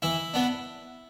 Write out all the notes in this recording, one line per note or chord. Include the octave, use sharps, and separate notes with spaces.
E3 E4
B3 D4